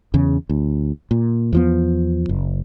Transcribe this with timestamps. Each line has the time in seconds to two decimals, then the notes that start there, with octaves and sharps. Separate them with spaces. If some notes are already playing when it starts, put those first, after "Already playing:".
0.14 E2 C#3
0.49 D2
1.11 A#2
1.53 E2 F3 B3
2.29 F#1